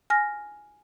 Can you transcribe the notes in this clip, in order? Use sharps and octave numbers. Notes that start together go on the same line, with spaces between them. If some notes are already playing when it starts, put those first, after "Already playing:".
G#5 F6 A#6